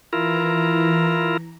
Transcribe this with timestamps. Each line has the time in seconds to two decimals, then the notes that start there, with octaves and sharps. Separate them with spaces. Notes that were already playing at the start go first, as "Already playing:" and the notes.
0.13 E3 E4 F4 A#4 A#5